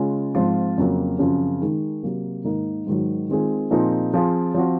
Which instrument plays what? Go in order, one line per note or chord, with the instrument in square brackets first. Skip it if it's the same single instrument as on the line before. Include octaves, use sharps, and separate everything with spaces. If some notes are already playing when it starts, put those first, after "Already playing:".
Already playing: [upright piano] C#3 G#3 C#4 F4
G#2 F3 C4 F4
F2 C#3 F#3 A#3
F#2 C#3 F3 C4
D#3 G#3 D#4
C3 F#3 A#3
G#2 D#3 A#3 D#4 A#4
G#2 D#3 F#3
D#3 G#3 C4 F4 G#4
A#2 F3 C4 D#4 G#4
F3 C4 F4 G#4
F3 C4 F#4